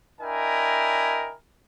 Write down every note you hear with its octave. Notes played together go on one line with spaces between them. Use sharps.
D4 E4 A#4 D#5 G5 G#5